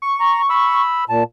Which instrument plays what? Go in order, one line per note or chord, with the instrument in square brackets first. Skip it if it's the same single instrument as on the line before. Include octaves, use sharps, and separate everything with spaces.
[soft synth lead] C#6
[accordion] A#5
B5 E6
A#2 A5